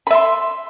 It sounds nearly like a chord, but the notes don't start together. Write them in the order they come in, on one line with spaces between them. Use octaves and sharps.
B5 E5 C6